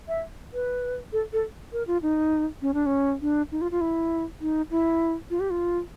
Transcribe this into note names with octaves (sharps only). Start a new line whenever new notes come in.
E5
B4
A4
A4
A#4
F4
D#4
C#4
D4
C#4
D4
D#4
F4
F4
E4
D#4
E4
F4
G4
F4